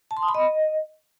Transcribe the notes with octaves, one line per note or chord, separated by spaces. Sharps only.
A5
C6
D#6
B5
D#5